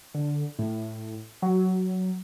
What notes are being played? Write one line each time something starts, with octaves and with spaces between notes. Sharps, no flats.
D3
A2
F#3